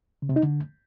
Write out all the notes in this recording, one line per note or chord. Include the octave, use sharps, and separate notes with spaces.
C#3
C3
D#4
D3